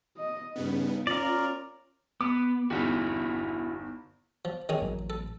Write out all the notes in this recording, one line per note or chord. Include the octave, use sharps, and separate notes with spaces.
D#5
G2 C#3 B3 D#4
C#4 F4 A#4 D5
B3 D6
G1 E2 D#4 E4 F#4
F3
D#3 C#4 G#4
A1 A2 F#3
A4